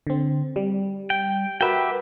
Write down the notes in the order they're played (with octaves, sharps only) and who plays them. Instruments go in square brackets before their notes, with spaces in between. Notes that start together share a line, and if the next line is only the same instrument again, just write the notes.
[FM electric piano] D3 C4
G3
[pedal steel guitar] G5
[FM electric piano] F#4 A#4 B4 [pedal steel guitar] G4 E5 G5